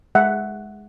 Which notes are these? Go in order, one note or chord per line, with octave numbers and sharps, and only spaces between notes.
G#3 E5 F#5